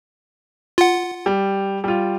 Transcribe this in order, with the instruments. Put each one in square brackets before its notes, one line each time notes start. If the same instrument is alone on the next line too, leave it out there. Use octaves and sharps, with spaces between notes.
[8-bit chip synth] F4 F#5
[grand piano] G3
G3 F4